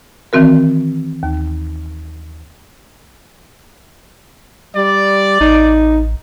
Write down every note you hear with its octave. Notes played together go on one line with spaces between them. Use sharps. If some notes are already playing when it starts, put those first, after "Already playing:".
D#3 E3 C4 F#4 A#4
D#2
G3 D5
A1 D#4